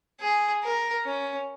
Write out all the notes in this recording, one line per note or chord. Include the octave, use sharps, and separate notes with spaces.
G#4
A#4
C#4